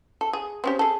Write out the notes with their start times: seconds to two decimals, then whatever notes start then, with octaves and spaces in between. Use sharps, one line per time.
0.21 A4
0.33 G#4
0.64 C4 C#4 G4
0.79 G#4 A4